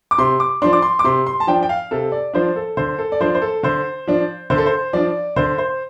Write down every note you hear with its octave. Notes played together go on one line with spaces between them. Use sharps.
D6
C3 C6
D6
F3 D4 C6
D6
C6
D6
C3 C6
C6
A5
F3 D4 G5
G5
F5
C3 A4
D5
F3 D4 C5
A4
D3 C5
A4
D5
F3 D4 C5
C5
A4
D3 C5
F3 D4
D3 C5
A4
C5
F3 D4 D5
D3 C5
C5